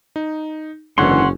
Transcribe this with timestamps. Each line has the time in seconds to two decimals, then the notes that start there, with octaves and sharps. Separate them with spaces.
0.16 D#4
0.98 F#1 G#2 D3 E3 C#4 F#5 C6